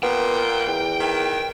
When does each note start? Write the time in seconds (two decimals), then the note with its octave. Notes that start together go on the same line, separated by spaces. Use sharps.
0.03 A#2 B3 G5
0.67 E2
1.00 D#3